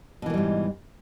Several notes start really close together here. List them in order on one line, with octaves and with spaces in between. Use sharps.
B2 E3 A#3 G3 G#2